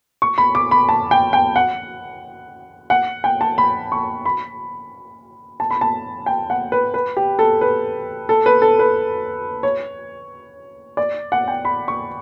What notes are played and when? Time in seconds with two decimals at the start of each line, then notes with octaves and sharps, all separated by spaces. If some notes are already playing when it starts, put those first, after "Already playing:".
0.22 C#6
0.38 B5
0.55 D6
0.71 B5
0.89 A5
1.11 G5
1.33 G5
1.56 F#5
2.90 F#5
3.24 G5
3.41 A5
3.58 B5
3.92 C#6
4.25 B5
5.60 A5
5.70 B5
5.81 A5
6.26 G5
6.50 F#5
6.72 B4
6.94 B4
7.17 G4
7.39 A4
7.61 B4
8.29 A4
8.46 B4
8.62 A4
8.79 B4
9.63 C#5
10.97 D5
11.32 F#5
11.48 G5
11.65 B5
11.88 C#6